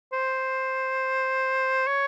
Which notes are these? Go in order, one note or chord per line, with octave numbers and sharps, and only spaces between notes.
C5
C#5